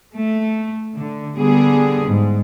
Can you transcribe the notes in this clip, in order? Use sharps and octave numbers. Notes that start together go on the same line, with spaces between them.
A3
D3
D3 G3 B3 G#4
G#2